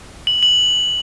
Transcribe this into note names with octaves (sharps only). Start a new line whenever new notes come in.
F#7
F#7